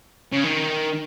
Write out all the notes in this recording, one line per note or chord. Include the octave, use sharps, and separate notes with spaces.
C#3
D#3